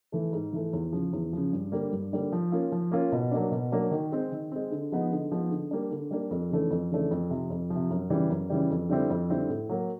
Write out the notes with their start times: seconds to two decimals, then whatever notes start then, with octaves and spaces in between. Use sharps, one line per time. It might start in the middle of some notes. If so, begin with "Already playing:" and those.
0.12 E3 A3
0.33 G#2
0.53 E3 A3
0.73 E2
0.93 C#3 F3
1.13 E2
1.33 C#3 F3
1.53 G2
1.72 D3 G3 A#3
1.92 G2
2.13 D3 G3 A#3
2.32 F3
2.52 A#3 C#4 F4
2.72 F3
2.91 A#3 C#4 F4
3.12 B2
3.31 F#3 A#3 D4
3.51 B2
3.72 F#3 A#3 D4
3.91 D#3
4.12 G#3 C4
4.32 D#3
4.52 G#3 C4
4.71 D3
4.92 F3 G#3 B3 D#4
5.12 D3
5.32 F3 G#3 B3 D#4
5.51 D3
5.71 G3 A#3 D4
5.91 D3
6.11 G3 A#3 D4
6.31 F2
6.50 C#3 E3 A3 D4
6.70 F2
6.91 C#3 E3 A3 D4
7.11 F2
7.30 C3 F3
7.50 F2
7.70 C3 F3
7.90 F#2
8.10 C#3 E3 G3
8.30 F#2
8.50 C#3 E3 G3
8.70 F2
8.90 D3 G3 C4 E4
9.10 F2
9.30 D3 G3 C4 E4
9.49 A2
9.69 F#3 A#3